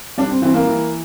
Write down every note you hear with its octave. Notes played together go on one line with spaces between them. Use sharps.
G3 D4
C4
E3 C4
A#3
E3